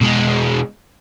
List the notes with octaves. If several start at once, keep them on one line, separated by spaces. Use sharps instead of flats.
B2 G#3